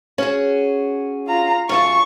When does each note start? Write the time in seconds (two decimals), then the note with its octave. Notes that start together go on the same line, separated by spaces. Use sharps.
0.18 C#4 F#4 G#4
1.28 F4 A#5
1.69 F#2 F4 A5 C#6